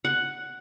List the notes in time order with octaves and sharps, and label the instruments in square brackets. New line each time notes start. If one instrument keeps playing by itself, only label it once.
[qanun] F#5